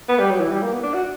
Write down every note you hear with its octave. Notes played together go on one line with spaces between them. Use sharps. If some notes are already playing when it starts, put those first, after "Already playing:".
B3
G3
F#3
E3
G3
A#3
B3
D4
F#4